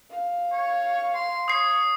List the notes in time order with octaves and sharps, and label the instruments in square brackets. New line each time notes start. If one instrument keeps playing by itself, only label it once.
[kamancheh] F5
[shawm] C#5
C6
[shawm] C#5 [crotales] D#6 C7